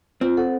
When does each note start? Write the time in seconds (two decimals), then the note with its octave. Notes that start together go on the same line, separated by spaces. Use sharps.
0.21 C4 F4
0.37 A4 C5 F#5